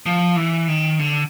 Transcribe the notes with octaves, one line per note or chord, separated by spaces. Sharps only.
F3
E3
D#3
D3